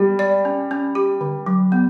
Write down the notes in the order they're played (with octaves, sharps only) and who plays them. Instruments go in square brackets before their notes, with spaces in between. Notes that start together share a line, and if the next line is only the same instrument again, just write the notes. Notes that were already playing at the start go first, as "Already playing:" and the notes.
Already playing: [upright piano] G3 [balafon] G4
[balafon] D5
C#4
C#4
G4
D3
F#3
B3